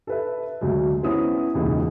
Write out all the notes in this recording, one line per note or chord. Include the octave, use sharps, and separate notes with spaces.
A4 B4 E5
D2 F#3 G#3
B3 C#4 E4 C5 D#6
E1 C#2 A#2 D#4